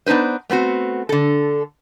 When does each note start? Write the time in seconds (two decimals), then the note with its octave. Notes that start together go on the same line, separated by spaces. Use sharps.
0.06 B3 D4 D#4 B4 C5
0.50 A3 B3 C4 F#4
1.09 D3 A4